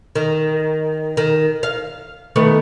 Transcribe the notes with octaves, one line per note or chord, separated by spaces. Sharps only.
D#3
D#3
F5
D#3 A3 B3